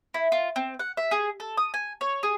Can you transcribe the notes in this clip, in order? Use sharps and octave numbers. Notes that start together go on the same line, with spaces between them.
E4
F4
C4
F#5
E5
G#4
A4
D#6
G#5
C#5
G#4